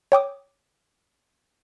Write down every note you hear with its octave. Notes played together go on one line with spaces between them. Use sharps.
C#5 G5 D6 D#6